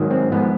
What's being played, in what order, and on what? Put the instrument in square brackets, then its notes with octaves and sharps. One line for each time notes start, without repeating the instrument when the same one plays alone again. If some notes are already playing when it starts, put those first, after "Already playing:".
Already playing: [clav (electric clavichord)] G#2 D#3 F#3
C4
G#2 F3 B3